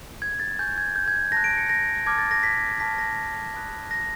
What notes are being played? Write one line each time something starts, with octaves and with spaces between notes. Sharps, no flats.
G#6
A6
G#5 C#6 F#6 G6
G#6
G6
G#6
A5 C#6 F#6 A#6
D7
C#7
A#6
A5 D6 F6 G#6
A6
A#6
B6
A5 C#6 F6 B6
A#6
B5 D#6 F#6
A#6